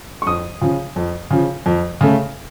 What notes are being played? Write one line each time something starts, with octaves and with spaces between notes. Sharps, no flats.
C#6
F2 D#6
C#3 F3
F2
C#3 F3
F2
C#3 A3